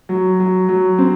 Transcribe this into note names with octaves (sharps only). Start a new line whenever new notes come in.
F#3
F#3
F#3
C4